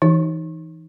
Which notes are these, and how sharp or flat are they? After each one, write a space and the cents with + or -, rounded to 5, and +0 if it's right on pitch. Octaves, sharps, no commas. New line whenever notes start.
E3 -5 D#4 +0